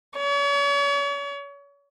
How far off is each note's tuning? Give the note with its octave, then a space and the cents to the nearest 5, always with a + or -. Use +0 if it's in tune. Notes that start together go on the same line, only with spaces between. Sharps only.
C#5 +40